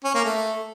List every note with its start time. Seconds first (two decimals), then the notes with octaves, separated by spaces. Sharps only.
0.04 C#4
0.14 A#3
0.25 A3